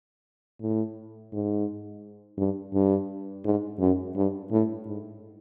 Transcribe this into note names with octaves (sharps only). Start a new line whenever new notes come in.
A2
G#2
G2
G2
G#2
F#2
G2
A2
G#2